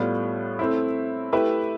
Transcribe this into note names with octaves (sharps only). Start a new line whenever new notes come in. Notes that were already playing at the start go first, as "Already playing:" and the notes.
Already playing: A2 G3 B3 F4
A3 C4 E4
A3 E4 G4 B4 E5